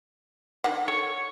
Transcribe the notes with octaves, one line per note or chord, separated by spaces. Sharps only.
D3 D#3 F#5
A4 C#5